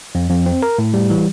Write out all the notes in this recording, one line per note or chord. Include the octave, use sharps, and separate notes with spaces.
F2
F2
C4
A#4
A2
G3
E3